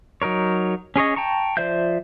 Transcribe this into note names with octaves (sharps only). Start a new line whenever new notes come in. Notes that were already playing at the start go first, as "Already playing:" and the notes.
F#3 D#4 A#4 C#5
C#4 G#4 C#5 D#5
G5 A5 A#5 C#6
F3 C5 D5 E5 G6